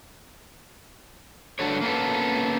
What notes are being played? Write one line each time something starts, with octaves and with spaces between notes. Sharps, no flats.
G2 D3 D#3 F#4 A4 C#5
A#3 B3 C#4 A4